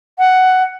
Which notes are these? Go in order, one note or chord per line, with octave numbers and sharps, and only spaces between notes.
F#5